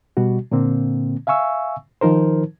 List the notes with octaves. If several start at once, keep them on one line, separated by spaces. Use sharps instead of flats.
B2 G3 F#4
A#2 D3 A#3 C4
E5 F5 G#5 C#6 E6
D#3 F3 D#4 A#4 C5